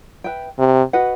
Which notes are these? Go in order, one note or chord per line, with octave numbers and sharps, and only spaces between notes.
B4 E5 G5
C3
F#4 B4 D#5 F#5